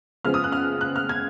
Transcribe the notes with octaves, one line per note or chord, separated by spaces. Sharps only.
C#3 F3 G#3 B3 F4 F6
D#6
F#6
F6
F#6
F6
G#6